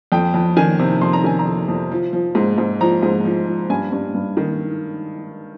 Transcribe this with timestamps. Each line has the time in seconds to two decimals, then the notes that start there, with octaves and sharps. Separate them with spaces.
0.12 F2 G5
0.34 F2
0.57 D#3 G#5
0.79 C3
1.01 F2 C6
1.13 A#5
1.24 D#3 G#5
1.39 A#5
1.46 F2
1.68 F2
1.91 F3
2.13 F3
2.35 G#2
2.58 G#2
2.81 F3 A#5
3.03 G#2
3.25 F3
3.47 F3
3.70 G2 G#5
3.92 G2
4.14 G2
4.37 D#3